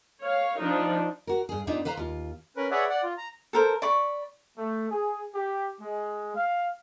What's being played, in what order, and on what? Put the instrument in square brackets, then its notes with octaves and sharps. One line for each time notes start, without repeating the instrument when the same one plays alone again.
[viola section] C#5 F5
F3 D4 D#4
[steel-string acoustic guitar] F#4 A#4
G2 G#4
G#2 B3 D4 D#4 F4
B4 C5 F5 A#5
D#2 F4
[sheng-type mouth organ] C#4 A#4 B4
G#4 B4 C#5 D5 E5 F#5
D5 F#5
F4
A#5
[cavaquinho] A4 A#4 C5
D5 B5 C#6
[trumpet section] A3
G#4
G4
G#3
F5